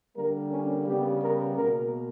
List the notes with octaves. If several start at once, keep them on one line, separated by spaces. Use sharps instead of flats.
D3 G3 A#3 A#4
C#4
C#3 G3 B3 G4
A#4
B2 A#3 A#4